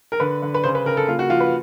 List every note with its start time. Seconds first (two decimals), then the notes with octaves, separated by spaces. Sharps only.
0.12 A#4
0.20 D3 B4
0.42 D3
0.54 B4
0.64 C#3 C5
0.75 B4
0.85 C#3 A#4
0.97 A4
1.08 A#3 F4
1.19 F#4
1.30 F3 F4
1.40 B4